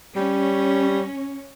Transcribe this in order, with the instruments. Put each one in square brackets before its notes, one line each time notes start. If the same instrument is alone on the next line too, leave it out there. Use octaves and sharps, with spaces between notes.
[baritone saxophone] G3 [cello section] C#4